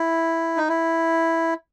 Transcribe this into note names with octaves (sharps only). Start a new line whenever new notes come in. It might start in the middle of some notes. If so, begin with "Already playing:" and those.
Already playing: E4
D#4
E4